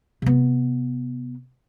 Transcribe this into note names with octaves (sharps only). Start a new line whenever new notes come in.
C3 B3